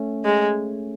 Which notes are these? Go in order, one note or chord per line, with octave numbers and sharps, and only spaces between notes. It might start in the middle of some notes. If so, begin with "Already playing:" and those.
Already playing: A3 C#4
G#3